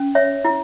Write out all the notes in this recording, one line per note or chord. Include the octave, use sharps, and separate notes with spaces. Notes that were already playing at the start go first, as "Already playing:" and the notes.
Already playing: C#4
C#5 E5
E4